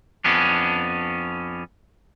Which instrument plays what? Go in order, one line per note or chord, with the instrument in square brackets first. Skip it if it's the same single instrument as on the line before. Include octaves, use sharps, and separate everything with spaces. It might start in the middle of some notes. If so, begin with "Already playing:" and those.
[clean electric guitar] F2 B3 C#4 D4